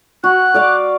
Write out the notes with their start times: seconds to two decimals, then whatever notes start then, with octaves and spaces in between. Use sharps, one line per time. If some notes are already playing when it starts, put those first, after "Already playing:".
0.24 F#4 F#6
0.54 D5 F5 D6